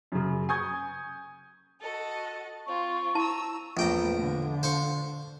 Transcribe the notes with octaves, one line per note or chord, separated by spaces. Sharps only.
F#2 C#3
G#5 C#6 D#6 G6 G#6
F#4 A4 D#5
C4 F4 C#6
E4 A5 A#5 E6
A#1 E2 A3 G5 A#5
D3
C5 F5 C#6